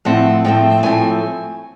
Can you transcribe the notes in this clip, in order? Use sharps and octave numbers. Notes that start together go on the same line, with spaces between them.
A2 F3 A3 C4 F#5
A2 F3 A3 C4 G5
A2 F3 A3 C4 G#5